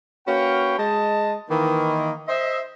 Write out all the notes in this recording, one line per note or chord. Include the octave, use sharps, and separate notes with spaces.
A#3 C#4 F#4 B4 F5 G5
G#3 D#5 A5
D#3 E3 A#3
C5 D#5 E5